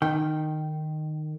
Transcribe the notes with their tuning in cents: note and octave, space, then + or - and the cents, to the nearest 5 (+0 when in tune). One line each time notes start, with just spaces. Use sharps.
D#3 -15 G5 -10